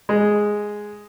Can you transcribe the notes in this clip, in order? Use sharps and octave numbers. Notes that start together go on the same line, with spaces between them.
G#3